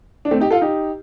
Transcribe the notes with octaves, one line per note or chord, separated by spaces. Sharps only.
D4
A3 C4
D#4 G4
F4 A4
D#4 G4